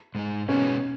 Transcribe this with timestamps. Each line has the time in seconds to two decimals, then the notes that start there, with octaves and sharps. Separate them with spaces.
0.15 G#2 G#3 D#4
0.48 B2 G#3 B3 C#4 D#4